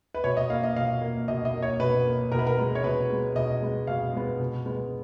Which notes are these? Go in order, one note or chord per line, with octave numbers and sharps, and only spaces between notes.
B4
B2 C#5
D#5
A#3 F5
D#5
B2 F5
A#3
B2 D#5
D#5
A#3
C#5
B2 B4
A#3
B2 A#4
B4
A#4
G#3 B3
C#5
B2 B4
G#3 B3
B2 D#5
G#3 B3
B2 F5
G#3 B3
B2
G#3 B3